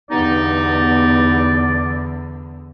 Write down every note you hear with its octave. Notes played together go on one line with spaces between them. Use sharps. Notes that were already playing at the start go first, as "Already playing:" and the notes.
E2 G2 D3 B3 D#4 D5